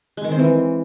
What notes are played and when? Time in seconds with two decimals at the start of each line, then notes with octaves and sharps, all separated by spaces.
0.17 G#3
0.24 D#3
0.32 C4
0.39 E3